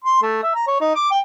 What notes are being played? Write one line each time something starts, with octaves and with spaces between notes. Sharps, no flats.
C6
A3
E5
A#5
C#5
D#4
D6
G5